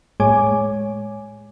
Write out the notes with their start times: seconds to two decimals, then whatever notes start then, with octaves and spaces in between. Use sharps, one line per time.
0.20 A2 G#3 C#5 G#5 D6